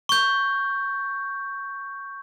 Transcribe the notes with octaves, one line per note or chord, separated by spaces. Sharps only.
C#6 G6